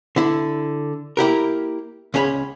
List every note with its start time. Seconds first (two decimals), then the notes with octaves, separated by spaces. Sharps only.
0.16 D3 E4
1.17 A#3 E4 G4 A#4
2.14 C#2 C#4 G#4 C#5 B5